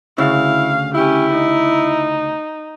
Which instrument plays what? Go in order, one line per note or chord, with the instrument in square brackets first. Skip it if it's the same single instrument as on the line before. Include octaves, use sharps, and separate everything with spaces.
[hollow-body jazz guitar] D2 C#3 [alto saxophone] E4 [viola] F5
[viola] C#4 G4 [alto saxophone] E4
[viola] D#4